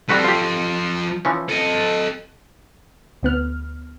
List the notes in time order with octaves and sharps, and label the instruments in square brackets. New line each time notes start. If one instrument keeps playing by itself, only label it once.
[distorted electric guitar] F3 A4 [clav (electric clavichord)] G3 F#4 B4
[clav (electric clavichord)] F4 G4
E3 F3 C#4
[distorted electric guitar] A4 D#5
[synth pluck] D2 B3 F6